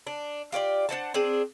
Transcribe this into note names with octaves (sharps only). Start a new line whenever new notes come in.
D4
F4 G4 C#5 D5
D4 C5 F#5 A5
C4 D4 G#4